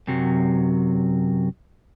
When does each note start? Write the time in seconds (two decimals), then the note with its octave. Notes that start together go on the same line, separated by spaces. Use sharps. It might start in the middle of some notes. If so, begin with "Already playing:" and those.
0.07 F#2 C3 F#3